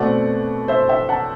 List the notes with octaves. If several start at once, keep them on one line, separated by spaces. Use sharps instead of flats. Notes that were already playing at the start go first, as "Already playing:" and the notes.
Already playing: B2 A3 C4 D5 F#5
C5 E5
E5 G5
F#5 A5